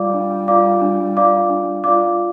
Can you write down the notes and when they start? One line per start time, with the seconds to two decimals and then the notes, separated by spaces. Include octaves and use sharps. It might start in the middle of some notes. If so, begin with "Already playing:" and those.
Already playing: G3 F4 D5 F5 D6
0.14 D4
0.48 F4 D5 F5 D6
0.82 D4
1.17 F4 D5 F5 D6
1.50 D4
1.84 F4 D5 F5 D6